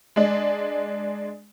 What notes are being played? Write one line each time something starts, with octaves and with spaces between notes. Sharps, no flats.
G#3 D4